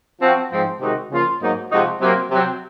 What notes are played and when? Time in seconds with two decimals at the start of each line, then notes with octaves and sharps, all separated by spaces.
0.20 F3 C4 F#4
0.50 G#2 F3 C4
0.80 C3 D#3 G#3 D#4 F#4
1.10 C#3 F3 A#3 F4
1.41 G#2 F#3 A#3 D#4
1.71 C3 F3 G#3 D#4 F#4
2.00 C3 F#3 A#3
2.30 C3 F#3 C4